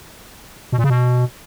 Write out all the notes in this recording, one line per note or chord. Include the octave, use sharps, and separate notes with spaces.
B2
A#2
C#3
B2